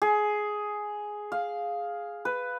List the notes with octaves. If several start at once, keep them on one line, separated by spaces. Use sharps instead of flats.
G#4
F5
B4